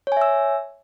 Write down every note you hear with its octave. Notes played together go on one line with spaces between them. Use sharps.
C#5 E5 G#5 E6